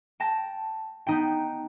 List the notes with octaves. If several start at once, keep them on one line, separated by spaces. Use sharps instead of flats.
G5 A5 A#6
B3 D#4 G5